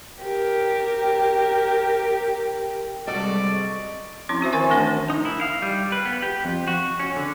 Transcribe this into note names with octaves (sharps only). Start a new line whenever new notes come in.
G4 A#4
C3 G3 G#3 F#4 A4 D5 D#5
F3 C4 C#4 E4 C6
C#4 F#4 C5 E5
D#3 E3 A#4 G#5 C#6
A3 D4 A5
D#4
E4
F5
G3
B4
B3
G4
F2
F#4
C#4
D3